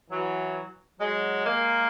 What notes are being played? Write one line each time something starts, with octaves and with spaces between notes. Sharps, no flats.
E3 F#3
F#3 G#3
G#3 A#3